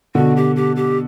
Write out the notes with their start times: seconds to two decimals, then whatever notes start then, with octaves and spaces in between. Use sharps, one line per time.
0.15 B2 D3 F#4
0.36 G4
0.56 G4
0.76 G4